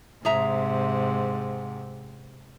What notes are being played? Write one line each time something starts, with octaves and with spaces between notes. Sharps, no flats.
G#2 C3 G#4 E5 A#5